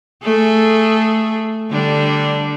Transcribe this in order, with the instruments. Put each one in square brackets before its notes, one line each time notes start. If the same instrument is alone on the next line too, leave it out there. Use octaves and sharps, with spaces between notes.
[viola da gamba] A3 G#4 A4
D3 G3 D4